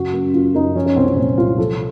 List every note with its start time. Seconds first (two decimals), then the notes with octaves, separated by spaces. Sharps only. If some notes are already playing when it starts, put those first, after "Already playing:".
Already playing: F#2 C#3 F#4
0.13 F#2
0.34 F#2 F4
0.55 F#2 D#4
0.75 F3 C#4
0.86 C#4
0.96 C2 C4
1.07 C4
1.17 A#2 C#4
1.38 C2 F4
1.58 F3 A4